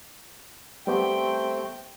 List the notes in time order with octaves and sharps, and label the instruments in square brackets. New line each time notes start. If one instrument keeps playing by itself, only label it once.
[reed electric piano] G3 B3 G4 [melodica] A3 C4 [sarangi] G5